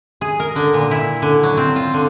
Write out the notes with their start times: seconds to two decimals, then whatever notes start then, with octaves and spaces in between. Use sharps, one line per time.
0.21 G#4
0.39 A#4
0.56 D3
0.74 A#2
0.91 E4
1.22 D3
1.43 F#3
1.57 C4
1.76 F4
1.94 D3